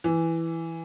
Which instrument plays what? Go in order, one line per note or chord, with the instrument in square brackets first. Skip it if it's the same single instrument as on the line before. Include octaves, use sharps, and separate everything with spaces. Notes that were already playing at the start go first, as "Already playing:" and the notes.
[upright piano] E3